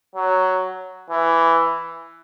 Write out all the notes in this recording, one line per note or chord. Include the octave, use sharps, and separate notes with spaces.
F#3
E3